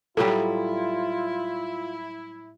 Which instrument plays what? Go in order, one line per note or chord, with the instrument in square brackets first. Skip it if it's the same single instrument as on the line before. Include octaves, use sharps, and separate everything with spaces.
[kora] A2 F#3 G3 [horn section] E4 [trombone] F4 [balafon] A4